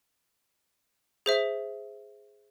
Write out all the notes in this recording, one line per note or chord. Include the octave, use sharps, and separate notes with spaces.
G#4 C5 E5